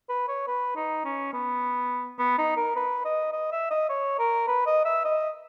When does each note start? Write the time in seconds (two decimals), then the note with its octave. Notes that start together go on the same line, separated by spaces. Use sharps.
0.09 B4
0.28 C#5
0.47 B4
0.76 D#4
1.05 C#4
1.33 B3
2.19 B3
2.38 D#4
2.57 A#4
2.76 B4
3.05 D#5
3.33 D#5
3.52 E5
3.71 D#5
3.90 C#5
4.19 A#4
4.47 B4
4.67 D#5
4.85 E5
5.05 D#5